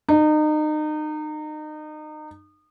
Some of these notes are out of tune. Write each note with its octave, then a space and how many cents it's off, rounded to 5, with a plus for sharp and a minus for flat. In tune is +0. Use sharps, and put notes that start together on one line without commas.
D#4 -30